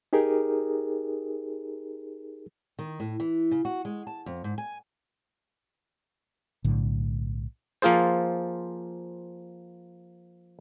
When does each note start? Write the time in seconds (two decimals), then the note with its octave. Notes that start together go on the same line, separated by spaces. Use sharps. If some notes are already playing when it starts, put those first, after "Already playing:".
0.13 D#4 G4 G#4 A#4
2.79 D#3
3.00 A2
3.20 E3
3.51 C#3
3.65 F#4
3.85 G#3
4.07 A5
4.26 F2
4.44 G#2
4.58 G#5
6.64 B1 A2 D3
7.82 F3 A#3 F4 G#4 C5